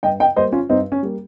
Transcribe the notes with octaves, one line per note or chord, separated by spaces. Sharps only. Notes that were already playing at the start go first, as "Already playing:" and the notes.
G2 D#5 G5
D#5 G5
G3 A#3 C5 D#5
C#4 F4
G2 C4 D#4
C#4
G3 A#3